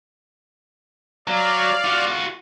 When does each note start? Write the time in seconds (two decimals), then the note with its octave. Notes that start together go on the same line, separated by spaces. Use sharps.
1.28 F#3 D5 F5
1.84 F4 F#4